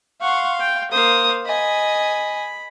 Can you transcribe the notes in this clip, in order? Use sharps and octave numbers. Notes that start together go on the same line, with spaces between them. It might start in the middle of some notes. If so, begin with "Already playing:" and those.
F5 F#5 C6 C#6
G5
A#3 C5 F5 D#6
D#5 G#5 B5